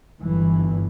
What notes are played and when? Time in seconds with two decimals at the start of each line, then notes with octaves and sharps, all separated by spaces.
0.21 G1 G2 E3